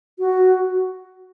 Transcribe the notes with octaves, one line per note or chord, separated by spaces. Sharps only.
F#4